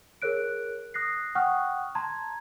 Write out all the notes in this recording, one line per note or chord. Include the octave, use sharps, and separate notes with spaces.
G#4 A#4 C#5 F#6 D7
D#6 F#6 A#6 C7
F#5 G5 C#6 D#6 F6 F#6
A5 A#5 C6 G#6